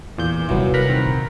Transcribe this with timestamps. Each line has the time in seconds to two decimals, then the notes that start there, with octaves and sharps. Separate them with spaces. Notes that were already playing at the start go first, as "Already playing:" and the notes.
0.18 E2 A#2 G6
0.49 D#1 C3 E3 F#3 B3
0.74 A#4 F#5 A#5 B5
0.88 D#3 C4
1.06 A#2